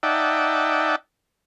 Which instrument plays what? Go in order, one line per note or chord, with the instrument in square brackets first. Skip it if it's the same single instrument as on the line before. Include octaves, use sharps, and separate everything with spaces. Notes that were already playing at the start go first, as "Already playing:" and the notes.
[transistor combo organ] D#4 D5 E5 F#5 G5 A5